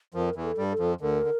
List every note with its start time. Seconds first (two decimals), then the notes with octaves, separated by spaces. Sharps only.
0.14 F2 F3 A#4
0.36 E2 E3
0.43 A4
0.58 G2 G3
0.72 A4
0.79 F2 F3
1.01 D2 D3 A#4
1.23 D3